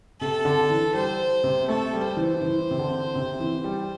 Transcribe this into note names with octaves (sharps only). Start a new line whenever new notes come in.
C3 A4
D3
E3
G3 C5
C3
A3 A4
G3
C5
E3
E3
C3
D3
C3
E3
G3